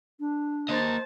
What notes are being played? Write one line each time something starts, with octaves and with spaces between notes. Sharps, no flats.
D4
A#3 C5 D#5 A5